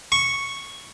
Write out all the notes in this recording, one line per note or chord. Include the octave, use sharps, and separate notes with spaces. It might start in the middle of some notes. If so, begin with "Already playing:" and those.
C#6